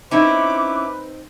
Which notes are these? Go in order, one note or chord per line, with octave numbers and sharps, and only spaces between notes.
C4 C#4 D#4 E4 B4 D6